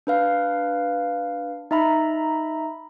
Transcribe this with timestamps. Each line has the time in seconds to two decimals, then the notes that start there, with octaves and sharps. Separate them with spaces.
0.07 D4 B4 F5
1.71 D#4 E5 A#5 B5